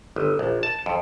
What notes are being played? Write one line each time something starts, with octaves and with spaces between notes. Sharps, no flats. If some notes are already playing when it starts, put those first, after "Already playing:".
G1
A#1
A5
F2